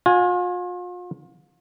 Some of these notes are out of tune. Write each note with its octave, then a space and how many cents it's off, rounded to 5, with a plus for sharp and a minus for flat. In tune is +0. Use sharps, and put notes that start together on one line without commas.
F4 +40 G#5 +0